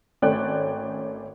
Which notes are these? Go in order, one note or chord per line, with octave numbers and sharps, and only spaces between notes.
G#1 A3 C#4 D5 G5 F#6